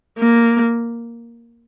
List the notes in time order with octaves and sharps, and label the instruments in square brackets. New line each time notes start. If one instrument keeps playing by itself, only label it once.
[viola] A#3